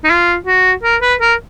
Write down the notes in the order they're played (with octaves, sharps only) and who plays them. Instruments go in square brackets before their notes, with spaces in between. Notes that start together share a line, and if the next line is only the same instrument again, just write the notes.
[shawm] D#4
F4
F#4
A#4
B4
A#4